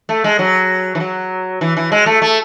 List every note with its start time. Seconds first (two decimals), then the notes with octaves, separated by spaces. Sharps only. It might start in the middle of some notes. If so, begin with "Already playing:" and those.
0.09 A3
0.24 G#3
0.39 F#3
0.95 E3
1.00 F#3
1.61 E3
1.77 E3
1.92 G#3
2.06 A3
2.22 A3